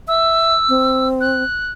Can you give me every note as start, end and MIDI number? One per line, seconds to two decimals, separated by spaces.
0.08 0.55 76
0.08 1.08 88
0.69 1.43 60
1.21 1.72 90